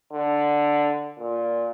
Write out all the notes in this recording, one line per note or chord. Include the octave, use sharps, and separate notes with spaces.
D3
A#2